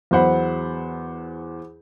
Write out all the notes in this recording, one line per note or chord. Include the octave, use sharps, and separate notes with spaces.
E2 F#3 C5 F#5 B5